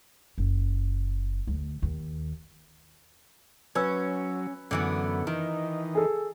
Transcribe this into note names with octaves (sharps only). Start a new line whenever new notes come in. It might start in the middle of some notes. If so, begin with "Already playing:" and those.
F#1
D2
D#2
F#3 C#4 B4 E6
F#2 D3 E3 B3
D#3 E3 D#4
G#4 A4